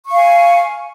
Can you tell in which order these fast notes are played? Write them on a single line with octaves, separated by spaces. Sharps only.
C#6 F5 G#5